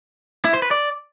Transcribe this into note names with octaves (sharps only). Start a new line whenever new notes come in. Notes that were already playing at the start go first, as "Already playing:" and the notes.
E4
C5
B4
D5